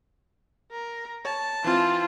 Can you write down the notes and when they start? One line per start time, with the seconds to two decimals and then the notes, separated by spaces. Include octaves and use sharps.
0.71 A#4
1.25 C#5 A5
1.64 E3 C4 F4